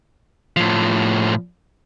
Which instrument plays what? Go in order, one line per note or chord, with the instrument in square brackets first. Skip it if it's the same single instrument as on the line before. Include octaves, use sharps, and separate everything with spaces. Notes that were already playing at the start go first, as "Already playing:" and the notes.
[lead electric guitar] A2 F3